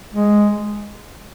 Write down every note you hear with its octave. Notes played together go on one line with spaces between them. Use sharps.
G#3